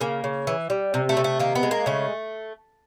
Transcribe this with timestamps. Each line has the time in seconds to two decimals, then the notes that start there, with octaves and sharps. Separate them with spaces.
0.01 C#3 A#3
0.24 C#3
0.47 E3
0.70 G3
0.94 C3
1.09 A3
1.17 C3
1.24 A3
1.39 D#3 A#3
1.55 B3
1.63 G#3
1.71 A#3
1.86 C#3 A3